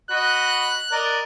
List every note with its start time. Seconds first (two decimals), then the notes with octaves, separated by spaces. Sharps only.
0.11 F#4 D#5 B5 F#6
0.92 A#4 D5 D#5